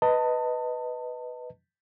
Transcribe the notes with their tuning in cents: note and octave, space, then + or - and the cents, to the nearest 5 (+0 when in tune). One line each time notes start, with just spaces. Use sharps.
B4 +0 D#5 +10 A5 +30